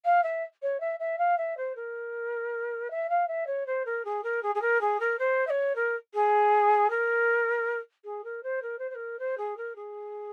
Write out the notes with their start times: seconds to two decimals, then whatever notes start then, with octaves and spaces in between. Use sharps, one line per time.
0.05 F5
0.23 E5
0.62 C#5
0.80 E5
0.99 E5
1.18 F5
1.38 E5
1.57 C5
1.75 A#4
2.90 E5
3.09 F5
3.28 E5
3.47 C#5
3.66 C5
3.85 A#4
4.05 G#4
4.23 A#4
4.43 G#4
4.55 G#4
4.61 A#4
4.81 G#4
5.00 A#4
5.19 C5
5.47 E5
5.50 C#5
5.75 A#4
6.14 G#4
6.90 A#4
8.04 G#4
8.24 A#4
8.43 C5
8.62 A#4
8.78 C5
8.90 C5
8.95 A#4
9.19 C5
9.37 G#4
9.57 A#4
9.75 G#4